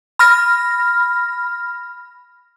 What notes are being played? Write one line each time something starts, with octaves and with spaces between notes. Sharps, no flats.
B5 F6 A#6